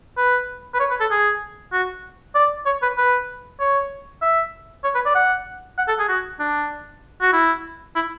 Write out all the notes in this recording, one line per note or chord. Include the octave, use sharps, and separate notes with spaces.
B4
B4
C#5
B4
A4
G#4
F#4
D5
C#5
B4
B4
C#5
E5
C#5
B4
D5
F#5
F#5
A4
G#4
F#4
D4
F#4
E4
E4